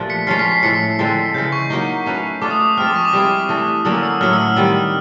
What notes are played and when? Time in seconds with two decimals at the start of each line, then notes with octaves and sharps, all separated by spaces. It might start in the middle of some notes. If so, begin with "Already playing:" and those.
Already playing: A#2 F3 A3 D4 G4
0.10 B6 C#7
0.27 F3 G#3 C#4 F4 C7
0.39 B6
0.52 C7
0.63 A2 F3 A3 B6 C#7
0.99 D3 F3 G#3 C4
1.34 C#3 E3 G#3 G6
1.52 C#6
1.70 F#3 A#3 D#4
2.06 A3 C#4 F#4 B4
2.42 A3 D4 F4 D6
2.51 D#6
2.60 D6
2.77 F3 G#3 C4 F6
2.87 D6
2.96 C#6
3.05 D6
3.13 G3 C4 E4 G#4
3.49 E3 A3 D4
3.85 D3 F#3 A#3 C#4 E6
4.03 E6
4.21 A2 F#3 A3 F6
4.33 E6
4.46 F6
4.56 D#3 G3 C4